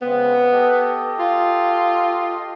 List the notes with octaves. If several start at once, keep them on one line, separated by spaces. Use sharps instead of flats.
C#3 G#3 B3 C4
G4 A4 D#5
F4